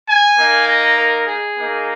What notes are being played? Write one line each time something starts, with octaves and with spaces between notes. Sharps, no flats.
G#5
A#3 D#4
D#5
A#4
G#4
A#3 D#4